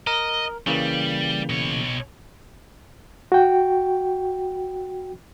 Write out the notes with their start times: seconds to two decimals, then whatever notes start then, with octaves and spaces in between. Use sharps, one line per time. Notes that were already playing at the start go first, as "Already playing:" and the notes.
0.07 A#4 D#5
0.67 C#3 E3 G3 A#3
1.49 B2 C#5
3.32 F#4 G5